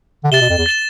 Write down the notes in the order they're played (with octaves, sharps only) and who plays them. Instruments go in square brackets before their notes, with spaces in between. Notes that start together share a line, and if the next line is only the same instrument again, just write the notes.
[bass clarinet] D3
[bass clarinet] C3 [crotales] A6 E7 G7
[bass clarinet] B2
F2
E2
[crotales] A6 E7 G7